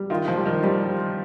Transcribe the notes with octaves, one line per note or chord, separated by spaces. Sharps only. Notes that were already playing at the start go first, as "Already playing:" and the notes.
Already playing: G3
D#3 F4
F3
G3
D#3
F3 G3